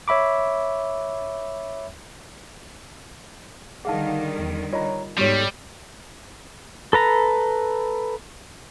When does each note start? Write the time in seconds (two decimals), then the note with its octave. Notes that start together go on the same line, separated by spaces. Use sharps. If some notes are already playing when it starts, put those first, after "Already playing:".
0.08 C#5 E5 B5 D6
3.85 D3 D#3 G3 D#4 G#4 F5 F#5 A5
4.39 E2
4.73 F4 C#5 D#5 A#5
5.17 G#2 G3 B3 F#4 G4 A4 C#5
6.93 A4 B4 A#5